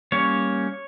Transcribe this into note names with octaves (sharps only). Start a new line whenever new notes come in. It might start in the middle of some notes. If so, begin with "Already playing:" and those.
G3 A#3 C#4 C#5